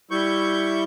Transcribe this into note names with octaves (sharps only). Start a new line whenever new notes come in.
G3 E4 C#6 G6